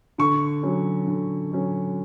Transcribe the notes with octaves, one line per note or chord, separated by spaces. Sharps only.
D3 C#6
F#3 C#4
D3
F#3 C#4